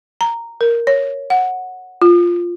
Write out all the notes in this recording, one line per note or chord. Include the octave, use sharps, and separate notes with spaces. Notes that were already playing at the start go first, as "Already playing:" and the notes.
A#5
A#4
C#5
F#5
F4